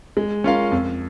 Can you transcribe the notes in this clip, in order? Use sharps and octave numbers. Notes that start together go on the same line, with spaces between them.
G#3
C#4 F4 A#4 F5
F2